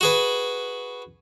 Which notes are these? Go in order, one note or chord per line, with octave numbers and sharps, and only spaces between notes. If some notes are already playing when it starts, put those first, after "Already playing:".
F#4 G#4 B4